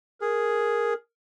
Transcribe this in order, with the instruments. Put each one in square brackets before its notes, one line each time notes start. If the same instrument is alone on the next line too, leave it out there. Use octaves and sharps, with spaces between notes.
[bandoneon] G#4 [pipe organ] A#4